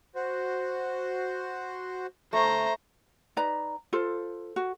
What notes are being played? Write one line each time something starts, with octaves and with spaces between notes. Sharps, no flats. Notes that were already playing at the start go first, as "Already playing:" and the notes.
F#4 C5
D2 A3 C5 A#5
D#4 B4 D5 A#5
F4 A4 C5
F#4